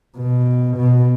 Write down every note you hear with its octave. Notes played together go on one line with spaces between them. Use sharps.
B2
B2